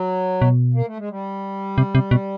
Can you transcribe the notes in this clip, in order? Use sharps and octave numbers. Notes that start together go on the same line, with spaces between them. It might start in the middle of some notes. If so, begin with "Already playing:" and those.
Already playing: F#3
B2
A#3
A3
G#3
G3
C3
C3
B2